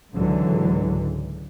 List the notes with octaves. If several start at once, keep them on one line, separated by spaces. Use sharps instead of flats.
C#2 G#2 D3 E3 F#3